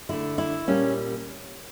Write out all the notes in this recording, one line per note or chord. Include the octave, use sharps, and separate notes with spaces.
D3 A3 E4
E4
A#2 G3 A#3 C#4